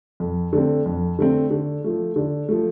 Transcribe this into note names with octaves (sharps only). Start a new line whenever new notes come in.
F2
D3 A3 C4
F2
D3 A3 C4
D3
F3 A3
D3
F3 A3